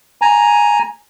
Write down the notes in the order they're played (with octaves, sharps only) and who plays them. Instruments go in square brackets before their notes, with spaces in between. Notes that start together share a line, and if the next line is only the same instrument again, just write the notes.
[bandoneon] G#5 A#5